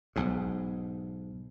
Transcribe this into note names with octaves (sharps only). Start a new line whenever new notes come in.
B1 G#2